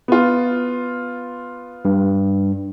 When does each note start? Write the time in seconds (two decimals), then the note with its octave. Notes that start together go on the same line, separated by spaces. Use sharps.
0.08 B3 F4
1.85 G2